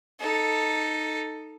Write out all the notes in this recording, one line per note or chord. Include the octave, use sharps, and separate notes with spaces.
D#4 A4